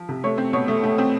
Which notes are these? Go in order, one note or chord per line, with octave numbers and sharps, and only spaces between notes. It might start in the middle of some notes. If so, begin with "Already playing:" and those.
Already playing: F3
C3
A3 C#5
C4
B2 C#5
A3
A3
C4